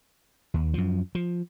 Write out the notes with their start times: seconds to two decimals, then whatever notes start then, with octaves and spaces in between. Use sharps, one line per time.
0.54 D#2
0.74 F#2 F3
1.15 F3